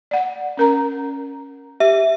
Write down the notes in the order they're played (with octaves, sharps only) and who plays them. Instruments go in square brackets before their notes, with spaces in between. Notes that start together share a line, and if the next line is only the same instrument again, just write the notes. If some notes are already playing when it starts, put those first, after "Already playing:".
[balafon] D5 F#5
C#4 A#4 A#5
[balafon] G4 [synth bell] E5